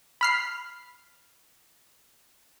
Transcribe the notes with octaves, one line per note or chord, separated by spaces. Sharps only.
B5 F6 C7